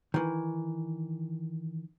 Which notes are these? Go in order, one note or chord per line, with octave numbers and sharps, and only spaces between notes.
D#3 E3